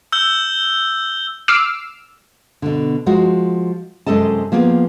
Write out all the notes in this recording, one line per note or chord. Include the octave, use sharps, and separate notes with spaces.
E6 G6 G7
D6 E6 F6 C7 D7
B2 D3
F3 G#3 F#4
F#2 C3 G#3 A4 D#5 A5
F3 A#3 B3 G#4